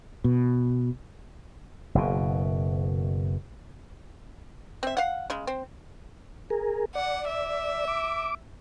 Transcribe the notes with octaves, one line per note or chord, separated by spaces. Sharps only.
B2
F#1 B2
C4 E5
F5 F#5
C#3 G#3
C4
G#4 A#4
D5 F#5
E5
D6